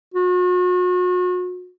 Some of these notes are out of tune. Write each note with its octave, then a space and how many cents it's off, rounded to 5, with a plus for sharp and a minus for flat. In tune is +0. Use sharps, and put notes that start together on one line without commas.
F#4 -40